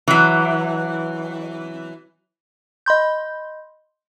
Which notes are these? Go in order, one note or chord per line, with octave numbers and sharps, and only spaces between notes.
E3 F#3
D#5 B5 C6 G6